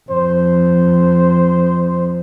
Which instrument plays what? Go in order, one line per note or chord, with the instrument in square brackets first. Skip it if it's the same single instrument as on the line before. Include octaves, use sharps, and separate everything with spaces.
[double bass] F2 [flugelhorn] C5